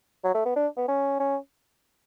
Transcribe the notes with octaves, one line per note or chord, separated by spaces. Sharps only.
F#3
A3
B3
D4
B3
C#4
C#4